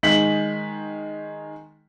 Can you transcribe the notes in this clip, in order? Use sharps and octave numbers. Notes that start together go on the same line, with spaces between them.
D#3 G#3 B6 F#7